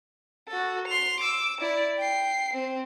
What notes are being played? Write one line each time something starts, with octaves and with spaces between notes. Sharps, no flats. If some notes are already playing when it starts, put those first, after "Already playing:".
F#4 A4
C6 F7
D6 E6
E4 D5
G5 C7
C4